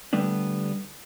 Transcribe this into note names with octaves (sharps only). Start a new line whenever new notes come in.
D3 G3 A3 B3 D4